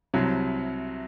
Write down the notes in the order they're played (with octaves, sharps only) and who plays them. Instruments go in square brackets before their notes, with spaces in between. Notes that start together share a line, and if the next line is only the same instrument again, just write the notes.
[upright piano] C2 C3 F#3